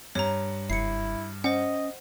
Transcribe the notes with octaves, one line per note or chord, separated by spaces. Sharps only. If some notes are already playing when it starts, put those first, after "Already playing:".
G2 C#5 A#5
F#1 E4 C7 C#7
C#4 C5 D#5 F#5